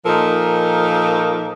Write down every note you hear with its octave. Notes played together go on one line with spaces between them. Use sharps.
A#2 F3 D#4 A4 A#4